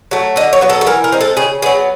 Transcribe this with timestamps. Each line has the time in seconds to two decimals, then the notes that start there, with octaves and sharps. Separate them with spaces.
0.11 F#3 A3
0.36 D3 D#5
0.53 C#5
0.61 F#3 B3
0.70 A4
0.81 A4
0.87 E3 A#4
1.04 A#4
1.12 G#3 C4
1.21 A4
1.37 C#3 G#4
1.62 F#3 B3 G#4